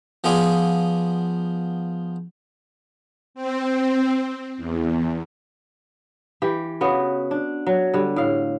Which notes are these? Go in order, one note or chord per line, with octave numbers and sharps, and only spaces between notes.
F3 B3 F4 G#4 D5
C4
E2
E3 G4
C#3 B3 F#4
D4
F#3
D3 G3
A2 F5